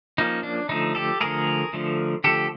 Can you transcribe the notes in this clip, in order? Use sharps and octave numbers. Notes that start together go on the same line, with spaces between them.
F3 A#3 C#4 D#4
D4
D3 F3 A3 D#4
G4 A4
D3 F3 A3 G#4 A#4
D3 F3 A3
D3 F3 A3 G4 A4